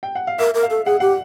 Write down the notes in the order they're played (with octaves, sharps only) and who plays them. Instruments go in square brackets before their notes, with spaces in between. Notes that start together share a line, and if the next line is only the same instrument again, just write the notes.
[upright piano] G5
F#5
F5
[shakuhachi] A#4 [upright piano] E5
[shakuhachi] A#4
[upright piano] F5
[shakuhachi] A4
[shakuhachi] G#4 [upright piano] F#5
[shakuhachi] G4 [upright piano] F#5